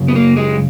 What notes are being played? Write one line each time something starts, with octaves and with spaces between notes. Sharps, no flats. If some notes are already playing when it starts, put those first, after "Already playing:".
Already playing: F#2 C#3
B3
A#3
G#3